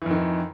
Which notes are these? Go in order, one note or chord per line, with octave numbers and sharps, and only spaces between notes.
F2 D#3 E3